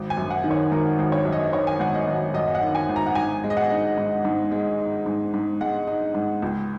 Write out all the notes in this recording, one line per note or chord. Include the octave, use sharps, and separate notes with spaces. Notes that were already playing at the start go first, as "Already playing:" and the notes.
Already playing: G#1
G#5
F#2
F#5
D#3
C#5
G#1 A#4
G#1
C#5
F#2
D#5
D#3 C#5
G#5
G#1 F#5
D#5
G#1
F#2 D#5
F#5
D#3
G#5
G#1
A#5
F#5
G#2 G#5
G#3
D#5
F#5
D#4
G#2
G#2
G#3
D#4
G#2
G#2
G#3 F#5
D#4
G#2
C#2